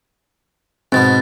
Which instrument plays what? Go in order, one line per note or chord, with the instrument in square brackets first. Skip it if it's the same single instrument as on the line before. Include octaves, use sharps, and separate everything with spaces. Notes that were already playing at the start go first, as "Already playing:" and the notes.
[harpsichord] G#2 B2 B3 [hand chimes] C4 A6